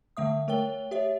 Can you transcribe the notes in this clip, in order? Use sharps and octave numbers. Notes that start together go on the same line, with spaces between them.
D3 A3 E5 D#6
A3 A#4 C#5 G5 G7
G4 C#5 E5